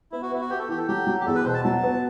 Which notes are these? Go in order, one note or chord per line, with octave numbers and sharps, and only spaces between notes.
B3 E4
F#4
B3 E4
F#4
B3 G4
A4
E3 G4
A4
F#3 G4
F#3
G4
E2 A4
B4
B2 C5
A5
F#3 A5
B3